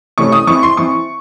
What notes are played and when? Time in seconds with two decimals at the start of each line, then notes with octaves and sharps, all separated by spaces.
0.18 C3 E3 A3 C#4 C#6
0.32 D#6
0.47 E3 C4 C#6
0.63 C6
0.77 E3 C4 C#6